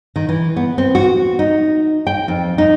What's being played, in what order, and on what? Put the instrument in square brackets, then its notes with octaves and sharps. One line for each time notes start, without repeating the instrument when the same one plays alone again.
[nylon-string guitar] D#3
E3
B3
C4
F#4
D#4
G5
F2
D#4